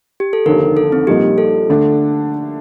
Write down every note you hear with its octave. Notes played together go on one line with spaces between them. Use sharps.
G4
A4
F1 D#2 D3 A#4
A4
C4
A#1 A#2 G3 A#3 D#4 G4
A4
D3 A3 D4